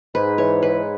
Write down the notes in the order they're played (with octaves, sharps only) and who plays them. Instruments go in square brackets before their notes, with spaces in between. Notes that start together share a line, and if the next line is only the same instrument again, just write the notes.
[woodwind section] G#2 [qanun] B4
[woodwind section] E3 [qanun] C#5
[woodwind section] G#2 [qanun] B4